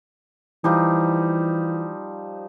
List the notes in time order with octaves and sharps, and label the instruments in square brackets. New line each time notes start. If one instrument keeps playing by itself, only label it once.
[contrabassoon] E3 [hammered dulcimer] F3 G3 D#4